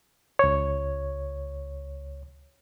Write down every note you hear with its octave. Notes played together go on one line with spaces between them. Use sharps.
C#2 C#5